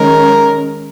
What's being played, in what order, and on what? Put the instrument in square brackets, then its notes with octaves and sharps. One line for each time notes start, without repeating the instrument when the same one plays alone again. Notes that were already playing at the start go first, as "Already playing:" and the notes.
Already playing: [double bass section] D#3 G#3 C#4 [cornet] A#4